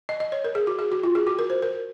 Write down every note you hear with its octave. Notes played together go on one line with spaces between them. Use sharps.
D#5
D#5
C#5
A#4
G#4
F#4
G#4
F#4
F4
G#4
F#4
A#4
C5
A#4